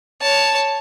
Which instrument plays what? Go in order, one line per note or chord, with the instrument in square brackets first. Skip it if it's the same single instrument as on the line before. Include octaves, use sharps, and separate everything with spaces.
[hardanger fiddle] C#5 A5